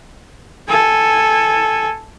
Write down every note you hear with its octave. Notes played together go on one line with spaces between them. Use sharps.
A4 G#5